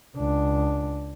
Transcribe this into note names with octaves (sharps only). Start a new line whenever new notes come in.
C#2 D4